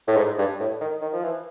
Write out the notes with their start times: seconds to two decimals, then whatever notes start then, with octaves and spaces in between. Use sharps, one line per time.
0.07 A2
0.16 G#2
0.38 G2
0.60 A2
0.81 D#3
1.01 D#3
1.13 F3
1.23 E3